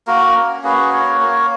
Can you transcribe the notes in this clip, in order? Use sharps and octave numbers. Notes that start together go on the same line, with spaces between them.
A#3 F#4 A#4
C#4
F#4 G#4 B4
A#3 A#4 C#5
A#3 A#4 C#5